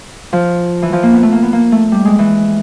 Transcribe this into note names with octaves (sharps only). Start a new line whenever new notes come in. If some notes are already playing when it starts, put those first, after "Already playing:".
F3
E3
F3
A#3
B3
A3
A#3
B3
A#3
A3
G3
G#3
E3